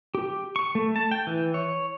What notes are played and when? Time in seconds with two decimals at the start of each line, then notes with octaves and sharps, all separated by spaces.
0.15 G4
0.56 C#6
0.75 A3
0.96 A5
1.11 G5
1.27 E3
1.54 C#5